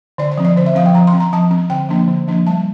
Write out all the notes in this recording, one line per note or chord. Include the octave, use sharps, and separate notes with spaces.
D3 D5
D5
F3 C4
D5
D3 C5
E5
F3 C4 F5
G5
F3 A#5
C6
C4
A#5
F3 A5
C4
D3 G5
F3 A#3 D4
D3
F3 A#3 D4
G3 A5